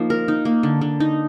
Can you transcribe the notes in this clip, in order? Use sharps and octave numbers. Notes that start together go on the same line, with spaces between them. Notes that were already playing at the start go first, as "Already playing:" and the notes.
Already playing: F3 A#3 D#4
A#4
D#4
A#3
D3
D3
D#4